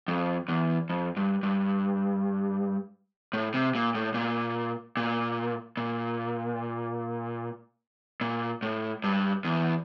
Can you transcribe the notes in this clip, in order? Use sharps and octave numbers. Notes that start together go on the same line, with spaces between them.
F2
E2
F2
G2
G2
A2
C3
A#2
A2
A#2
A#2
A#2
A#2
A2
G2
E2